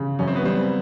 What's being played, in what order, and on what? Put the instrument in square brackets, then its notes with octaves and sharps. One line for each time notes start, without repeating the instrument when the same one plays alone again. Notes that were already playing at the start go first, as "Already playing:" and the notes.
Already playing: [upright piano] C#3
[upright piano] F#2 [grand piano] C#4
[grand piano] C4
B3
[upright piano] G3 [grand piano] C4